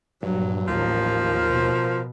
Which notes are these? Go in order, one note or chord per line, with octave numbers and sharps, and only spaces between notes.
A#1 G2 F#3
A1 D#2 F3 A#4
B2